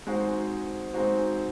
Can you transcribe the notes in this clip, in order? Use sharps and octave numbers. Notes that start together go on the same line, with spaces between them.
G#3 C4 D#4 F#4 C5
G#3 C4 D#4 F#4 C5